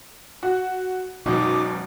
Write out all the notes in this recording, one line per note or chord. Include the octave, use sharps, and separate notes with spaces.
F#4
G#1 F#2 B2 D#4 D6